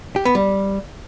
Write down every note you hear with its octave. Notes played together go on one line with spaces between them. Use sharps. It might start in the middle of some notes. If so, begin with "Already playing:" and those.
G4
B3
G3